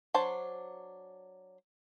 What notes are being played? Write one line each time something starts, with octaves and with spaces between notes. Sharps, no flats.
F#3 D4 C5 A5